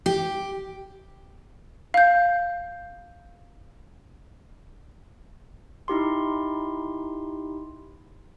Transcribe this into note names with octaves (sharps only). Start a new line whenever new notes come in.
G4
F5 G6
D#4 E4 G4 C6